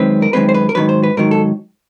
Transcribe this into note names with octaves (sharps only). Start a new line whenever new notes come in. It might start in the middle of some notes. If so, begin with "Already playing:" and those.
Already playing: F#2 D#3 G#3 C4 B4
A#4
F#2 D#3 G#3 C4 B4
C5
B4
A#4
G#2 D#3 F#3 B4
C5
B4
G#2 D#3 F#3 A#4
A4